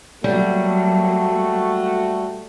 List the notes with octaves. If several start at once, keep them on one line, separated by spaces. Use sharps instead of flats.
F#3 G3 A3 A#3 F#4